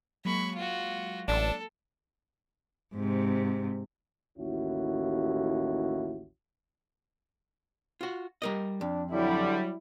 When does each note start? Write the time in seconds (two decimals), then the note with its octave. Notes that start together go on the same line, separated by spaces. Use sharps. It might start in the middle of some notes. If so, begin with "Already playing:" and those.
0.25 F#3 G#3 A#3 B5 C#6
0.56 F4 F#4
1.28 A1 D4 A4
2.95 G#2 C3
4.37 A1 D#2 C#4 E4 F#4
8.01 F4 F#4
8.42 G3 A#4 D#5
8.81 F2 D4
9.11 D3 F#3 G3 E4